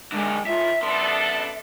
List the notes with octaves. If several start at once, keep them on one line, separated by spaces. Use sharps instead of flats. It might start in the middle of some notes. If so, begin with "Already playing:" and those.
B1 D3 D#3 G#3 A3
A2 D#3 F4 E5
F#2 B3 D4 A4 E5 C6